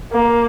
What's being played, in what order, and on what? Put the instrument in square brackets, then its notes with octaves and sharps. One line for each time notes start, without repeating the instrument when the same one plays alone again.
[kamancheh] A#3